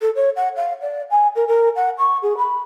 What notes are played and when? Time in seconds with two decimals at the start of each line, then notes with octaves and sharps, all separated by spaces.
0.01 A4
0.15 C#5
0.36 F#5
0.56 F5
0.81 D5
1.11 G#5
1.35 A#4
1.47 A#4
1.75 F#5
1.98 C#6
2.22 G#4
2.37 B5